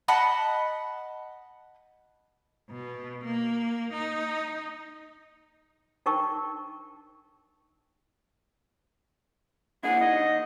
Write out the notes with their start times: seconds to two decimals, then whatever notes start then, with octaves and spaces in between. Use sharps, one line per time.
0.08 D#5 F#5 A5 B5
2.70 B2
3.24 A#3
3.92 D#4
6.06 D4 D#4 A#4 G5 A5 C#6
9.83 A#3 D4 E4 G#4 F#5
10.01 D#2 D#4 D#5